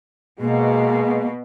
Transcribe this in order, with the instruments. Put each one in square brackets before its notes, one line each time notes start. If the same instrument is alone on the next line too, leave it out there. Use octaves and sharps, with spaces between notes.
[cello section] B2 [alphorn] G#3 [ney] A#3